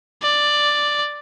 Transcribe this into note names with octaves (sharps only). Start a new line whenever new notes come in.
D5